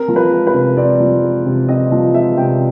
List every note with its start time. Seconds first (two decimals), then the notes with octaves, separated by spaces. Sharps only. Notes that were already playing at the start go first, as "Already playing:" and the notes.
Already playing: C4 A#4
0.08 F3
0.16 B4
0.32 G#3
0.47 B4
0.54 C3
0.77 C4 D5
1.00 F3
1.23 G#3
1.46 C3
1.69 C4 D#5
1.92 F3
2.14 G#3 E5
2.37 C3 G5